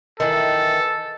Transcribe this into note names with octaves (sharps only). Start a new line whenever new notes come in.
D#3 E3 A4